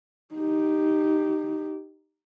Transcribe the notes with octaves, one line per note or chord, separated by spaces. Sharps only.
D#4 G4